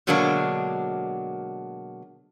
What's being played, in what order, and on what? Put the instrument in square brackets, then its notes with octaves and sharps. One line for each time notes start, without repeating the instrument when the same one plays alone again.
[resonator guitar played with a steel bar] B2 D3 F#3 G#3 A#3 D4